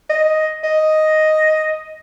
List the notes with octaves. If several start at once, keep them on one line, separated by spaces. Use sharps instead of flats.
D#5
D#5